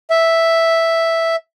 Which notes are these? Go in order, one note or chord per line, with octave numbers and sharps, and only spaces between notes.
E5